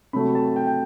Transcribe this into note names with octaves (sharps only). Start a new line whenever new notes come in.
C3 F#3 A3 B5
A5
G5
G5